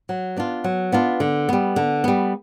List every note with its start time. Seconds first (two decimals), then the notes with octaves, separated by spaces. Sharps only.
0.09 F#3
0.36 B3 D4 F4
0.64 F#3
0.92 B3 D4 F4
1.20 D3
1.49 G3 B3
1.76 D3
2.04 G3 B3